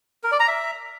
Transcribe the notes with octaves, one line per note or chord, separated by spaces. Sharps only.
A#4
D5
A#5
E5